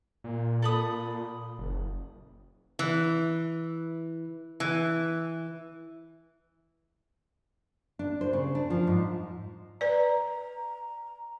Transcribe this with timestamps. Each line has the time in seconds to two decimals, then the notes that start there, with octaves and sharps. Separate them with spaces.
0.24 A#2
0.62 A4 B5 D#6
1.59 F#1
2.79 E3
4.60 E3
7.99 D4
8.21 C5
8.33 C#3
8.55 D4
8.70 F3
8.87 G#2
9.81 B4 D5 A#5